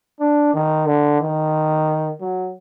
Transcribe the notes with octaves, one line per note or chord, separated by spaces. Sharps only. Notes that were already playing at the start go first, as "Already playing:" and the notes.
D4
D#3
D3
D#3
F#3